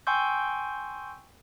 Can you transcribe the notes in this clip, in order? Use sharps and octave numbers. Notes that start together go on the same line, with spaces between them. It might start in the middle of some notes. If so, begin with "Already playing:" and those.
G5 G#5 C6 C#6 E6 G6